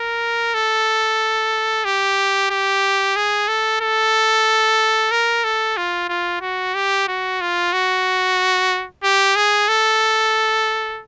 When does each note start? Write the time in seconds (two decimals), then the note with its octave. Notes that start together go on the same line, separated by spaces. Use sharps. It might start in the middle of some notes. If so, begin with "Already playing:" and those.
Already playing: A#4
0.54 A4
1.85 G4
2.50 G4
3.16 G#4
3.48 A4
3.81 A4
5.11 A#4
5.44 A4
5.77 F4
6.09 F4
6.42 F#4
6.75 G4
7.08 F#4
7.41 F4
7.73 F#4
9.04 G4
9.36 G#4
9.68 A4